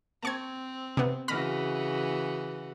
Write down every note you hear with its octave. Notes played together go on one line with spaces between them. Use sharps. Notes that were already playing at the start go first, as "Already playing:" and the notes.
C4 A5 C#6 G#6
C3 B3
C#3 E3 F#4 B5 F6 A#6